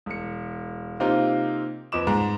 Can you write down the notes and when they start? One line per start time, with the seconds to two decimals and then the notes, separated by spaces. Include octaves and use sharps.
0.06 E1 C#7
1.00 C3 A#3 C4 D#4 F4 G4
1.92 F2 B4 D#5 D6 E7
2.07 G#2